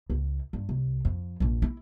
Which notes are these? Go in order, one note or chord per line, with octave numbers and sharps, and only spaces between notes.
C#2
G2
C2
F2
A#1 F2
E4